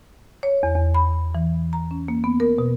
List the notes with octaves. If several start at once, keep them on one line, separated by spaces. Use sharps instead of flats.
C#5
E2
E2
B5
E3
A#5
C#4
A#3
B3
A#4
B2